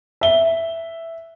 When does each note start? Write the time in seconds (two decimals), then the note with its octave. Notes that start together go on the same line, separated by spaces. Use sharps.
0.21 E5 G7